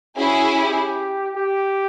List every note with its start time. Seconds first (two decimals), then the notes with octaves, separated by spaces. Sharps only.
0.17 C#4 E4 F#4 G#4
0.57 G4
1.36 G4